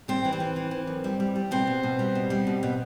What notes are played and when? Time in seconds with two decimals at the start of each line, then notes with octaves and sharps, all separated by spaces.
0.08 G3 C4
0.25 E3
0.33 C4
0.40 E3
0.56 E3
0.71 E3
0.87 F#2
1.04 G3
1.20 G3
1.36 G3
1.51 B2 C4
1.67 B2
1.83 B2
1.99 G3
2.15 B2
2.30 G3
2.47 B2
2.63 B2